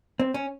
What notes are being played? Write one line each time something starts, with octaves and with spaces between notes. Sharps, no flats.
C4
C#4